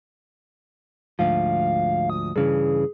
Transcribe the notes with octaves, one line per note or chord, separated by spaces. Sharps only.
D2 G#2 F3 F5
D#6
G2 C#3 E3 G#4